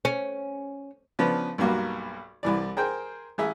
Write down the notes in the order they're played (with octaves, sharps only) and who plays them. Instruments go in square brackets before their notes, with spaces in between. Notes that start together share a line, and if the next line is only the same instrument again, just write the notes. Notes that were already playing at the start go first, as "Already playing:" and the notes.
[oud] C#4
[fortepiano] C#3 F3 B3 D4 B4
B1 G2 A#3 F#4
C2 E3 D5
G#4 A#4 C5 G5
A1 G#4 E5